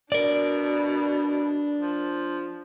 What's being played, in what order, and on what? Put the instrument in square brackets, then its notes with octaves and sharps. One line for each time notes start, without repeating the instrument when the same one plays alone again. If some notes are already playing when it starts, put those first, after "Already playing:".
[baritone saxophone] B2 [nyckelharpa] D4 [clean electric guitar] A#4 D5
[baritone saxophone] F3